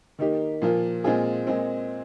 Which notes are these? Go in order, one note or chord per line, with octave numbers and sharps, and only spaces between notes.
D#3 A#3 D#4 G4
A#2 F3 A#3 F4
A#2 G#3 C4 F4 G#4
A#2 G#3 C4